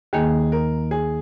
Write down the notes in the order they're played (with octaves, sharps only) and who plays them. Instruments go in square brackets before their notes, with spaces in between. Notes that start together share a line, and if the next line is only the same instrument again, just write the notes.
[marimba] D#2 D#3 A#3 [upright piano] G#4
[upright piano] A#4
G#4